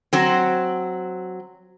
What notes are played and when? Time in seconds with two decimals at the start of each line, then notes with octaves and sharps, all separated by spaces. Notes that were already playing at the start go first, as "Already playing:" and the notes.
0.13 F#3 C4